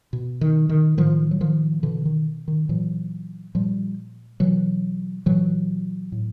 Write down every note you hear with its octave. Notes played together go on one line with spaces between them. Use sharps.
B2
D#3
D#3
A2 D#3 F3
F#3
D#3 F3
B2 D3 E3
D#3
D#3
A#2 E3 F#3
A#2 F3 G3
B2 E3 F#3
A#2 E3 F#3
A2